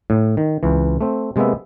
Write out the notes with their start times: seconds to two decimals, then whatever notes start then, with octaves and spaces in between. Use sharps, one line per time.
0.10 A2
0.37 D#3
0.63 C#2 E3
1.01 A3 C4
1.36 C3 G#3 A#3 B3 E5